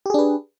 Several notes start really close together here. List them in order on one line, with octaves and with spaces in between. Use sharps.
G4 G#4 D4 B4